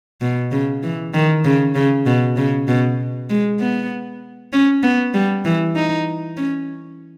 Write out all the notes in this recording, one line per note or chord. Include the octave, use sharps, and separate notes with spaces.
B2
C#3
E3
D#3
C#3
C#3
B2
C#3
B2
G#3
B3
C#4
B3
G3
E3
D#4
C#4